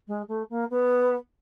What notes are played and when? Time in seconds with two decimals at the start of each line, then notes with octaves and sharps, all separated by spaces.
0.08 G#3
0.28 A3
0.50 A#3
0.70 B3